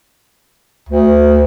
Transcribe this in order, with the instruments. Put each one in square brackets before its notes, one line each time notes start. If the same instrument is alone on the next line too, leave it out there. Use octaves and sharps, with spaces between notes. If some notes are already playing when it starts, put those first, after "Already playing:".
[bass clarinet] D2